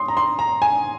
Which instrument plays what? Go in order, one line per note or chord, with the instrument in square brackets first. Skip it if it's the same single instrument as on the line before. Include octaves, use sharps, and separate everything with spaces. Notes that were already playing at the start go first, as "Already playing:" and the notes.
Already playing: [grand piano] C6 D#6
A#5
C6
A#5
G#5